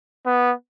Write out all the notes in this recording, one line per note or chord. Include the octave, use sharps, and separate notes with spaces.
B3